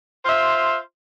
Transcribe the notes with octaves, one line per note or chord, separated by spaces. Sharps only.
F4 C5 E5